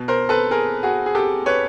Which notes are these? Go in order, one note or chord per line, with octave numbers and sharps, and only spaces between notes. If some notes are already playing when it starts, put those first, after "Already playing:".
Already playing: B2
A#4 C5
A4 B4
G#4 A#4
F#4 G#4
G#4
G4 A4
B4 C#5